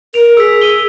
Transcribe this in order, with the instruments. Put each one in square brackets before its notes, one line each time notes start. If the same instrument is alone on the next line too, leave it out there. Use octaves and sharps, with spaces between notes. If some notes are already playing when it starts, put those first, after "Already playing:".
[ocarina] A#4 [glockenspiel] D7 F7
[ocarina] G#4 [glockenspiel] E6 B6
[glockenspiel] E6 D#7 G7